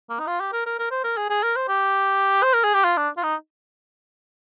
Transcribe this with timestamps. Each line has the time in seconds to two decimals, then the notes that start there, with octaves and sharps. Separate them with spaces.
0.10 A#3
0.20 D#4
0.27 F4
0.40 G4
0.53 A#4
0.66 A#4
0.79 A#4
0.91 C5
1.04 A#4
1.17 G#4
1.30 G#4
1.43 A#4
1.56 C5
1.69 G4
2.43 C5
2.53 A#4
2.64 G#4
2.74 G4
2.85 F4
2.97 D4
3.17 F4
3.23 D#4